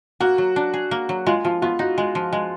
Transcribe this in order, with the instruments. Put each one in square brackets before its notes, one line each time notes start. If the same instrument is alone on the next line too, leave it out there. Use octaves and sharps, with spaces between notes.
[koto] A#3 [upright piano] F#4
[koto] F#3
D4
G#4
A#3
F#3
[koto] G#3 [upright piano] F4
[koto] F3 [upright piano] F4
[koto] B3 [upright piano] F4
[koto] D#4 [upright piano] F#4
[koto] G#3
F3
G#3